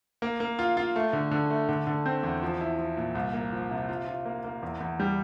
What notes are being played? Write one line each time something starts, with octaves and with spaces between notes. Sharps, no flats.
A#3
A#3
F4
F4
A3
D3
D3
A3
D3
D3
C4
E2
F3
E4
F3
A#2
C2
A#3
F3
C3
F4
F4
A#3
A#3
E2
E2
G3